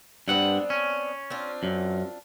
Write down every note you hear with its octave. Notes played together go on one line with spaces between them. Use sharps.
G2 B3 C4 D4 F#5
C#4
C4 D4 F4
F#2